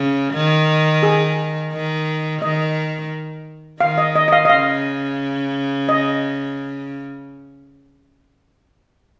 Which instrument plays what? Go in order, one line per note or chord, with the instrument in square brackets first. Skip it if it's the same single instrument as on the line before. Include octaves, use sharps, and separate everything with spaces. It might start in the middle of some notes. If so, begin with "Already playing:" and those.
Already playing: [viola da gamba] C#3
D#3
[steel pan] G#4
[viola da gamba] D#3
[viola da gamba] D#3 [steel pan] D#5
[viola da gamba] D#3 [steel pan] F5
[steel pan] D#5
D#5
D#5
F5
D#5
[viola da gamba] C#3 [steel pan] F5
[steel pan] D#5